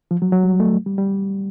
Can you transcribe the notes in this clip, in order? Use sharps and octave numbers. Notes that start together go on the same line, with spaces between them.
F3
F#3
F#3
G3
A3
G3
G3